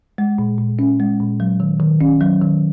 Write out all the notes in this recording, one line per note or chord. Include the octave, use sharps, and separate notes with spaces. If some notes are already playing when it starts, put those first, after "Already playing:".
G#3
A#2
A#2
C#4
G#3
A#2
F#3
D#3
D#3
C#4
F#3
D#3